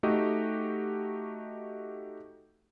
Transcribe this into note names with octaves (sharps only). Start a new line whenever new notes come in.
A3 D#4 F#4 G4 D#5